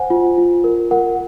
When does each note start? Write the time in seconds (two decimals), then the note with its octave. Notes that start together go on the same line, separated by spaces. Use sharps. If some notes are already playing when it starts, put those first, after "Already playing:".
Already playing: C5 F#5 G#5
0.10 F4
0.38 F4
0.64 A#4
0.91 A#4 F#5